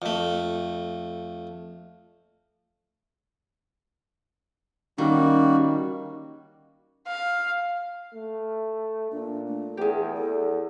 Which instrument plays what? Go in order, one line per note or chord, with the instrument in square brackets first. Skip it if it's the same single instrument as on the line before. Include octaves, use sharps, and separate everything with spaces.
[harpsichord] F2 A3
[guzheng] D#3 [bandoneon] G3 A#3 F#4 [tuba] C#4
[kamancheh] F5
[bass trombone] A3
[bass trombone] A#2 [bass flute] D4
[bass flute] A3
[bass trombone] E2 [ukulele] G4 G#4
[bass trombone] E2 [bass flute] A4